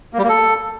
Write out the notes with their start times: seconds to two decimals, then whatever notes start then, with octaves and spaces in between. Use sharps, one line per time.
0.13 A#3
0.18 G3
0.24 A#3
0.29 A4